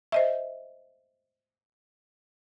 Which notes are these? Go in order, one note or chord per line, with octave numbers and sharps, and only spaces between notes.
C5 D#5 E5